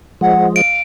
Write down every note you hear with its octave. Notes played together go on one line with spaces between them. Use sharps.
F3 G#3 F#5
F5 D7